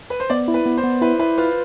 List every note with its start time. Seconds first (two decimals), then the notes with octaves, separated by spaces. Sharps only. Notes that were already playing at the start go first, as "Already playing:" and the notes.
0.10 B4
0.20 C5
0.30 B3 D5
0.48 E4
0.54 B4
0.66 B3
0.77 C5
0.83 B3
1.02 E4 B4
1.20 E4 B4
1.38 F4 B4